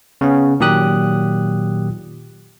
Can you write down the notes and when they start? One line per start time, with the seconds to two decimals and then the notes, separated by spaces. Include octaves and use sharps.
0.21 C#3 B3 C#4
0.60 A#2 D#3 F#3 G4 D#6 F#6